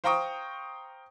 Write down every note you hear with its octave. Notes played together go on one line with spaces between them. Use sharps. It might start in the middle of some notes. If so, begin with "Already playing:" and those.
C5 F5 G5 A#5 C#6 D#6